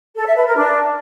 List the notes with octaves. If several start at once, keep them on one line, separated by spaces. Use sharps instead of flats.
A4
E5
B4
A#4
D4